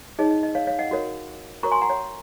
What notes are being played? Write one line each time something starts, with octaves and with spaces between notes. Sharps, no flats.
D#4 G#4 C#5 D#5
D#5
D#5
C#5 F5
C#5 F5
D#5 F#5
F#4 A#4 C#5
F#4 A#4 C#5 A#5 C#6
G#5 C6
F#5 A#5
C#5